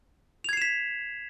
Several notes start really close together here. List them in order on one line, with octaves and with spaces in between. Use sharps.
F7 G#6 C7 E7 B6